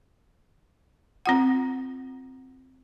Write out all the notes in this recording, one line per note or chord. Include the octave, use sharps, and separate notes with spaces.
C4 F4 F#5